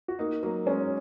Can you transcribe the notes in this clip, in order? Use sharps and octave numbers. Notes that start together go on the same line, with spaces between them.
F#4
A#3 D#4
F#3 A#3
G#3 C#4